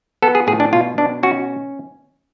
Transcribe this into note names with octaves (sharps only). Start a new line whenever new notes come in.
B3 A4
G#4
A2 G#4
D4
B2 F4
B2 D4
C#4 F#4